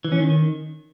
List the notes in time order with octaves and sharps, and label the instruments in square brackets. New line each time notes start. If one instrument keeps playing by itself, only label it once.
[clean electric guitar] E3
C#4
D#3